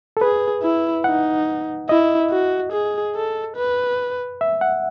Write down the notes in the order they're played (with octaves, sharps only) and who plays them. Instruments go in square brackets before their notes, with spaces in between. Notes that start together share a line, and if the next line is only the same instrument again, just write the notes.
[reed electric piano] A4
[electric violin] G#4 [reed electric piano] B4
[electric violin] E4
[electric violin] D#4 [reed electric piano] F#5
[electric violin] E4 [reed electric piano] D#5
[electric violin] F#4
G#4
A4
B4
[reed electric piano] E5
F#5